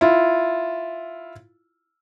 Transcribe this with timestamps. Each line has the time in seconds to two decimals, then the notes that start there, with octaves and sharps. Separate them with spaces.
0.01 E4 F4